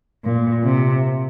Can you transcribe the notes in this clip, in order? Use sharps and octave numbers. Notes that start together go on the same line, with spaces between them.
A#2
C3